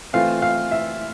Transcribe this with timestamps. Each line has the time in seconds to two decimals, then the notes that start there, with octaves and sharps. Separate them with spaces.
0.13 E3 A3 C4 F4 F5
0.42 F5
0.71 E5